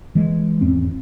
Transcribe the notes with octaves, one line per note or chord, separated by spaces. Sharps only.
E3 G#3
G#1 E2 C4 C#4